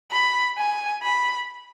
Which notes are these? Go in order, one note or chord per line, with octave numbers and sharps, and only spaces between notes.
B5
G#5
B5